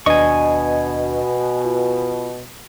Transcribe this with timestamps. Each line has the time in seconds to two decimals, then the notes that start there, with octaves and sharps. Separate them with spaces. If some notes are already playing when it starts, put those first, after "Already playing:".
0.06 D#2 B2 D4 D#5 G#5 C#6
1.65 F4